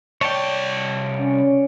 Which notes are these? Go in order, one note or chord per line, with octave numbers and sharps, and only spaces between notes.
C2 C#5 D5 G5 A5
C#4